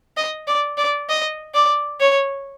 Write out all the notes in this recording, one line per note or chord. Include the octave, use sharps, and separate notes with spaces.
D#5
D5
D5
D#5
D5
C#5